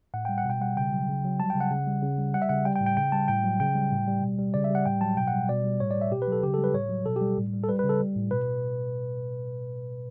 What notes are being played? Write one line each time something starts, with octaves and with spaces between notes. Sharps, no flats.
A2 F#5
G3 G5
F#5
B2 G5
G3 F#5
C#3 G5
F#3
C#3
F#3
G3 A5
G5
C#3
F#5
C#3
G3
C#3
G3
G3 F#5
E5
C#3 F#5
G3 G5
G5
A2
G5
C#3 G5
G3 A5
A2 G5
F#3
C#3 G5
G3
A2
G3
B2
G3
C#3 D5
E5
G3 F#5
A2 G5
F#3 A5
B2 G5
F#5
G3
B2 D5
G3
A2 C#5
G3 D5
E5
B2 G4
B4
F#3 A4
C#3 G4
A4
G3
B4
A2 C#5
F#3
B2 A4
G4
G3
A2
G3
A4
G3 B4
B4
C#3
A4
G3
A2
B2 B4